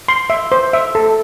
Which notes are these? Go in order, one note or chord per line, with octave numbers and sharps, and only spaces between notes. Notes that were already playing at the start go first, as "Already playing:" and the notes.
C6
E5
C5
E5
A4